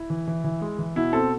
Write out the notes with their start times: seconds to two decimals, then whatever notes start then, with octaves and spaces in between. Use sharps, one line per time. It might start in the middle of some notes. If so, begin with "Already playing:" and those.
Already playing: E4
0.10 E3
0.28 E3
0.44 E3
0.62 G#3
0.79 E3
0.96 B2 E4
1.13 C4 A4